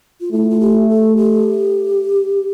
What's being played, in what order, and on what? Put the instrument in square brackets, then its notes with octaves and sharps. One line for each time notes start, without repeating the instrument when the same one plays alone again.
[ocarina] F4
[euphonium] A3 [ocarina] E4
[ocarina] F4
G4
A4
G4